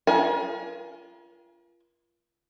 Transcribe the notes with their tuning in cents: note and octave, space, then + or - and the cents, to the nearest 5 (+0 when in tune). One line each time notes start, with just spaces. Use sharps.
F4 -25 A#4 +45 G#5 +20